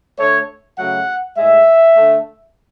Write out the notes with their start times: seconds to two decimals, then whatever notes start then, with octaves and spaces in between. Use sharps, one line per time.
0.19 D3 A3 C#5
0.78 C#3 F#3 A3 F#5
1.38 A2 G#3 E5
1.97 D3 A3